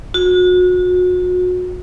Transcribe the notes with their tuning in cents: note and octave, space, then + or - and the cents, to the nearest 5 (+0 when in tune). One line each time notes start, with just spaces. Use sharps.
F#4 -35